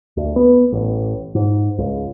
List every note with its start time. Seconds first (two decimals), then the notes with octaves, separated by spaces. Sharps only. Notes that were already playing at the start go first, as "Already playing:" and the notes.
0.17 D2
0.36 B3
0.72 A1
1.35 G#2
1.78 C#2